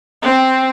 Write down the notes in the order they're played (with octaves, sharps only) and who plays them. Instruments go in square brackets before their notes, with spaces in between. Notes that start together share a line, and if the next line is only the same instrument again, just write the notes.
[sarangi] C4